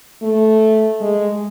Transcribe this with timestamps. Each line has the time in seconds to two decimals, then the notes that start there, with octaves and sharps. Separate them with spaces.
0.22 A3
1.01 G#3